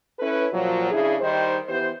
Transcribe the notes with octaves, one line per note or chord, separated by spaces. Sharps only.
C#4 E4 A4 B4
A#2 F3 F#3
C#3 D4 E4 G#4
D#3 G3 D#4 C5
E3 B3 G4 C5